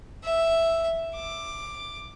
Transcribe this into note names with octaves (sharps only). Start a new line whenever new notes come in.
E5
D6